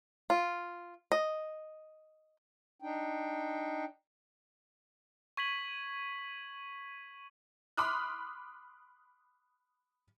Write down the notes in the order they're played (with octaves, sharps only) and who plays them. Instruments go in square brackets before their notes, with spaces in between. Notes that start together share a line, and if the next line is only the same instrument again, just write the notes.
[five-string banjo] F4
D#5
[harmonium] D4 D#4 G5
[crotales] C#6 G#6 B6 D#7 F#7
[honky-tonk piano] B5 C6 D6 D#6 F6 F#6